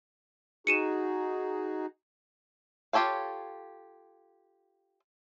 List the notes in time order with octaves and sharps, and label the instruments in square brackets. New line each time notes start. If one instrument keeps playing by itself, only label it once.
[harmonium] D#4 F#4 G#4 [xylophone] C#7 D#7 E7
[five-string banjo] F4 G4 A4 C#5 F5